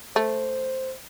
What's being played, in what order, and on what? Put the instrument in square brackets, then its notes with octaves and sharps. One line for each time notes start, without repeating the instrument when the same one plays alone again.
[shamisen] A3 [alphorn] C5